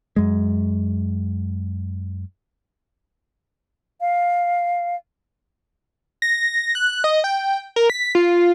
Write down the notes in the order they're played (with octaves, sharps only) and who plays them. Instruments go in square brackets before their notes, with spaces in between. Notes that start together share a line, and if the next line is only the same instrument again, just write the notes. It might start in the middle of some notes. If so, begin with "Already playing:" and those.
[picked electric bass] F#2 G#3
[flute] F5
[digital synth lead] A#6
F#6
D#5
G5
A#4
B6
F4